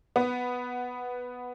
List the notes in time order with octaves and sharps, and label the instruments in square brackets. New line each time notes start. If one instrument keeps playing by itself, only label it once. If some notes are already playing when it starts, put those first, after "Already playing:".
[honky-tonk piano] B3